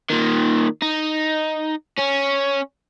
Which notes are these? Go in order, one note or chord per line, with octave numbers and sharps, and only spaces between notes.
A#2 D#3
D#4
C#4